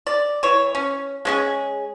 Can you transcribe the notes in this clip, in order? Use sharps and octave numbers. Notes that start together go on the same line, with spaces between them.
D5
E3 C#5
C#4
G#3 C#4 G#4